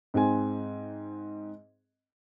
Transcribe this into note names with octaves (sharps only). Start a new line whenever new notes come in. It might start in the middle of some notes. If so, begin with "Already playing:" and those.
G#2 C4 G#4 G#5